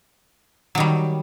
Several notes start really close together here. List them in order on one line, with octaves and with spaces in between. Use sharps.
F#3 D#3 G3